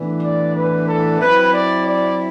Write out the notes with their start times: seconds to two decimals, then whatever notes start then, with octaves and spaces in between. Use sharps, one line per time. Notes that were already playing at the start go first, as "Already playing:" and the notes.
Already playing: A2 E3 B3 D4
0.22 D5
0.54 B4
0.87 A4
1.19 F#3 C4 E4 B4
1.53 D5
1.86 D5